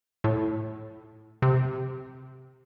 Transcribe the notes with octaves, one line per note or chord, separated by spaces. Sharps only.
A2
C3